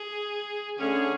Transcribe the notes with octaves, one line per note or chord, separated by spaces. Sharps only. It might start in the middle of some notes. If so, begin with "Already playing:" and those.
Already playing: G#4
D3 A3 C#4 G#4